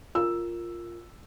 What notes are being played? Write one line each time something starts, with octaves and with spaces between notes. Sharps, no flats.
F4 A#4 E6